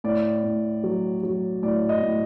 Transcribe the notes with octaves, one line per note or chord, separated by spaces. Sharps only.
A2 D5
A2
F#3
F#3
A2 D5
D#5
A2